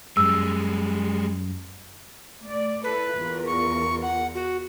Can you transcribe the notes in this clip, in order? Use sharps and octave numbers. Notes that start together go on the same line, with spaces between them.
F#2 G3 G#3 E6
A3 D5
E4 A4 B4
E2 F4 A#4
C#6
F#5
F#4